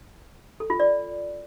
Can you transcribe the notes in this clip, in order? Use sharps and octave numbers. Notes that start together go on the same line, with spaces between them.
A4
F4
D5